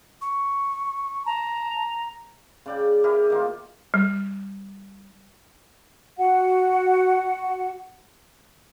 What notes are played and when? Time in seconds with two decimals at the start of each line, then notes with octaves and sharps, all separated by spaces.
0.21 C#6
1.26 A5 A#5
2.66 C#3 D5 G5
3.04 E4 G4 G#4 A#4
3.30 D#3 A#3 F4
3.94 G3
6.18 F#4 F#5